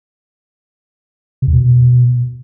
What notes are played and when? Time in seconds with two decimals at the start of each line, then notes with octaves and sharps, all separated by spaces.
1.42 C3
1.48 E2
1.53 B2